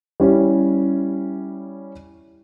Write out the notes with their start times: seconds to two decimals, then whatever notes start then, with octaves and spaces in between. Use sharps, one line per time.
0.20 G3 C#4 E4